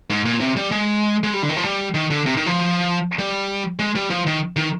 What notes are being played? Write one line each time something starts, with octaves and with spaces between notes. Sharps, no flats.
G#2
A#2
C3
G3
G#3
G#3
G3
D3
D#3
F3
G3
D#3
D3
C3
D#3
F3
G3
G#3
G3
F3
D#3
D#3